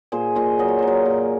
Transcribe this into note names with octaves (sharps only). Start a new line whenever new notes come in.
A#2 G#4 C5
A#2 C5 D#5
F#3 D#5
C#5
F#3 C5
A#4 C#5
A#2